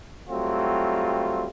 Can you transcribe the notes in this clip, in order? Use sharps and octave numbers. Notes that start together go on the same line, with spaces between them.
F#3 G3 A3 C4 F4